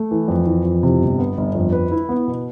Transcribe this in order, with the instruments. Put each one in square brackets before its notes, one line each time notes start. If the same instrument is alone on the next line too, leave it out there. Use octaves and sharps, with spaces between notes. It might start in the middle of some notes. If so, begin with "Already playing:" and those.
Already playing: [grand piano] A3
E3
F2
E3
F2
C3
G1
B3
G1
F2
B4
E4
B3
B2